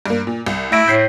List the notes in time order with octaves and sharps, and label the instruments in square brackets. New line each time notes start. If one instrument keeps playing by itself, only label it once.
[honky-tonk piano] G2 A#3
A#2
C2
[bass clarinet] A3 [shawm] E4 [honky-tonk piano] E5 A#6 D7
[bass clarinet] A2 [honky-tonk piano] G6 B6 C7